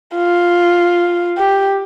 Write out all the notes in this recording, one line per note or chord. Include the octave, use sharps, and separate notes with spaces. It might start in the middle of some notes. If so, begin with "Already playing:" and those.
F4
G4